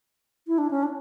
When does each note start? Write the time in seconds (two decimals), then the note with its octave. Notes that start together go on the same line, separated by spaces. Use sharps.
0.47 E4
0.58 D4
0.71 C#4
0.83 D4